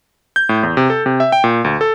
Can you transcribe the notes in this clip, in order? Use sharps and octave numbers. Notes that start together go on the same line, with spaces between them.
G6
A2
E2
C3
A4
C3
E5
G5
A#2
D2
A4